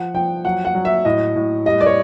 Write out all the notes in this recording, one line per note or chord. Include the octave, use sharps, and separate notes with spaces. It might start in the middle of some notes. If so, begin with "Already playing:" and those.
Already playing: F3 F#5
F3 G5
F#3 F#5
F#5
F#3
E5
A2 D#5
A2
G3 D#5
D5
C#5